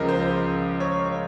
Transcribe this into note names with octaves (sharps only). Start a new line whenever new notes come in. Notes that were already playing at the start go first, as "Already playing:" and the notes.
Already playing: C#2 C#3 F3 A#4 D#5
C5
C5
C#5